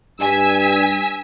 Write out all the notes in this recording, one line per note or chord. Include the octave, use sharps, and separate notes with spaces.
G2 G#5 E6 B6